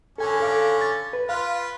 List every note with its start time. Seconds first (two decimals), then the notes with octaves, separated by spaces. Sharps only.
0.18 D3 C#4 A4 G#5
0.40 A4 F5 D6
0.81 A6
1.13 B4
1.29 F4 B4 F5